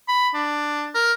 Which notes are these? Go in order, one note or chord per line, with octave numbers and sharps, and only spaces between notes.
B5
D4
A#4